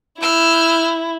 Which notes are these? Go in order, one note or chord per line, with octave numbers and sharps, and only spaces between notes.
E4 E6 F6 G6